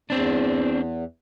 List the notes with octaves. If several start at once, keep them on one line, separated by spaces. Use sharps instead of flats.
E2 C4 D4